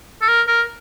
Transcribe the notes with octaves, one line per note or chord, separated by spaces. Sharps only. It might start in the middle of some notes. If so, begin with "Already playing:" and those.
A4
A#4
A#4